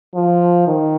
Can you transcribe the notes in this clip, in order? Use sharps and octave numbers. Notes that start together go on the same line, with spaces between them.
F3
D#3